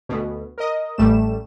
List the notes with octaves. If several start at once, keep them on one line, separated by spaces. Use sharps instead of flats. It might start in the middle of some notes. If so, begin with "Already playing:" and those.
D2 B2
A#4 D#5
A1 G3 A3 E7